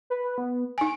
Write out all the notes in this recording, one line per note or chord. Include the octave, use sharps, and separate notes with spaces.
B4
B3
D#4 G#5 D7